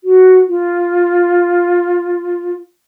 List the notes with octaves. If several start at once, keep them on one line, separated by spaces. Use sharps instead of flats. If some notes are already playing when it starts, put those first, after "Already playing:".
F#4
F4